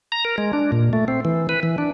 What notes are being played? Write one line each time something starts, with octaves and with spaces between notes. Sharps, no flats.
A#5
A#4
G#3
D4
A#2
A3
C4
E3
B4
E3
D4